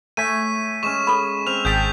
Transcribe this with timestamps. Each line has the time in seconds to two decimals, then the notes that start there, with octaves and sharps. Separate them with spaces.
0.17 A3 C#5 G#5 B6 D#7
0.83 G#3 C#4 C#6 E7
1.07 A4 B5
1.46 C4 F6 F7
1.65 G#1 G#4 G5 A5 G6 B6 F7